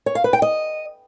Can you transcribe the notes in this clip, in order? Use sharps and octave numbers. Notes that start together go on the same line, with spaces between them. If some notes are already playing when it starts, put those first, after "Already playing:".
C#5
F5
B4
G5
D#5